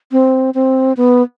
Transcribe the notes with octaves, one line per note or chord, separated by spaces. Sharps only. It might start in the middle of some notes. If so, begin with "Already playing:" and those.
C4
C4
B3